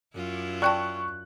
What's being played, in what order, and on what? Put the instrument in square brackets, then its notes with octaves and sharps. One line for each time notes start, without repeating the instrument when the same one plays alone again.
[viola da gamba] F#2 E4 F4
[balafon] D5 G5 A5 [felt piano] C#6 F#6